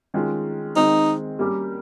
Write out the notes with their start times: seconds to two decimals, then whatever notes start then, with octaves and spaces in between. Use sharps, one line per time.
0.14 D#3 G#3 C#4 F4
0.76 D#3 G#3 C4 D#4
1.39 G3 A#3 C#4 G4 A#4